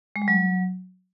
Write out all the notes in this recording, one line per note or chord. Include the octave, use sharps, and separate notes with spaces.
G#3
G3
F#3